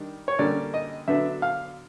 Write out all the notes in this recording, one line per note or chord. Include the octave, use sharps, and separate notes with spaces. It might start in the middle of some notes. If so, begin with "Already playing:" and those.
Already playing: D#3 G3 D4
C#5
D3 G3 A#3 C#4 D5
D#5
D3 F#3 B3 D4 E5
F5